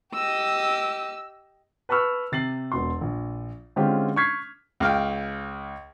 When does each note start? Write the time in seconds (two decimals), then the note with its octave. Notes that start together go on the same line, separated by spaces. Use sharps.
0.14 G4 D#5 E6
1.89 B4 A5 B5 C#6 E6 F6
2.32 C3 A6 C7 F#7
2.72 E1 B2 C6
3.01 A#1
3.76 D3 G#3 C4 C#4 F4 G4
4.16 C#6 F6 G6 G#6 B6 C7
4.80 C#2 F5 G5